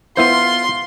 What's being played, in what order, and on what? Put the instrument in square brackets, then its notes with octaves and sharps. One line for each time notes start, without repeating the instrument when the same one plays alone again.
[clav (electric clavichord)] B3 E4 C5 [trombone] F4 [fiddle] C6